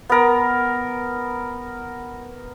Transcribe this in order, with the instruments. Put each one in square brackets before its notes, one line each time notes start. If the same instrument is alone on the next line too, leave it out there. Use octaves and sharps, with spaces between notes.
[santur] B3 A#4